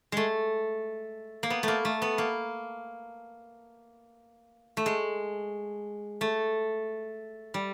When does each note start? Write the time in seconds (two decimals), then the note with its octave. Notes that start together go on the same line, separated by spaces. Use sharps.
0.12 G#3 A3
1.43 A#3
1.50 B3
1.63 A3 A#3
1.85 A3
2.02 B3
2.18 A#3
4.77 A3
4.86 G#3
6.21 A3
7.54 G3